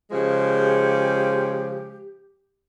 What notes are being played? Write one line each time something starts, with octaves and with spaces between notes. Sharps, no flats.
C#3 F3 G#3 G4